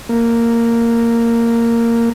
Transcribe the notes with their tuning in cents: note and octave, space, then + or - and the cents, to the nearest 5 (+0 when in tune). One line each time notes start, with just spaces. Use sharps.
A#3 -10